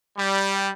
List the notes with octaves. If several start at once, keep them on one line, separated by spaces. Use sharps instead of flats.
G3